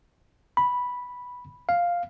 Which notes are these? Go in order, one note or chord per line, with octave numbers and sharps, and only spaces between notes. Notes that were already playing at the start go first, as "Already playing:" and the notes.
B5
F5